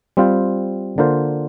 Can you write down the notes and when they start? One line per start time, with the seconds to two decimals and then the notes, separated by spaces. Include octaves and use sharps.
0.17 G3 C4 F4 C5
0.98 D3 A#3 F4 C5